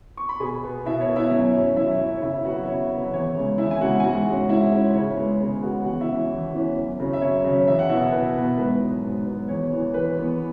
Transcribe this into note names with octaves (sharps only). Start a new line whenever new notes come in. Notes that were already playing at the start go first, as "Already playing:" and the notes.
C#6
B5
B2 G#4 G#5
B3
B2 E4 E5
C#5
B3
E4 E5
F#2 C#5
F#3 C#4
F#2 E4 E5
F#3 C#4
C#5
C#3 E4 E5
F#3 B3 F#4 F#5
E5
C#3 C#5
F#3 B3
E5
E2 C#5
C#3 G#3
E2 E4 E5
G#5
C#3 G#3 F#4 F#5
G#5
G#2 F#4 F#5
G#3 C#4
G#2 E4 E5
G#3 C#4
C#3 C#5
G#3 B3
C#3 C#5
G#3 B3 F#4 F#5
E2 F#4 F#5
E4 E5
E3 C#4
E2
E3 C#4
F#2
C#3 F#3 C#4
E5
F#2 C#5
C#3 F#3 C#4
E2 E5
F#5
B2 B3 E4 E5
E2 B4
B2 B3
G#2 B4
F#3 B3
G#2
F#3 B3
E2 C#5
E3 B3
E2 B4
E3 B3